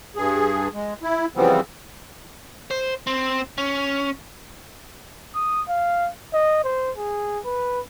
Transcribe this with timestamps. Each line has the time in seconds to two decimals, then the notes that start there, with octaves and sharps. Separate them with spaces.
0.16 G2 G#4
0.74 G#3
1.03 E4
1.36 C#3 E3 F3 G3 B3 C4
2.71 C5
3.07 C4
3.58 C#4
5.35 D#6
5.69 F5
6.33 D#5
6.64 C5
6.97 G#4
7.45 B4